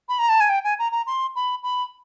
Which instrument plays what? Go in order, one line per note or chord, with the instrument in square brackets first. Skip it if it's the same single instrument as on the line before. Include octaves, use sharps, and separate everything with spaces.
[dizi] B5
A#5
A5
G#5
G5
G#5
A#5
A#5
C6
B5
B5